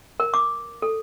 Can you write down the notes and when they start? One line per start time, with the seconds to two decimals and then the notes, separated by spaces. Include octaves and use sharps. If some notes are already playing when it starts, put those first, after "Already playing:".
0.20 A#4
0.34 D6
0.82 A4